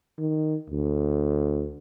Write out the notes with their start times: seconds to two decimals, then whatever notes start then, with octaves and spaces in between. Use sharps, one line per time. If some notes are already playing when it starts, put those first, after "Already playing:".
0.18 D#3
0.70 D2